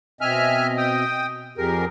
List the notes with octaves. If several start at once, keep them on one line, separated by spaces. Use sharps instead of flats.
B2 C4 D#5 E5 G#5 F6
G5 D#6
F2 G4 G#4 A#4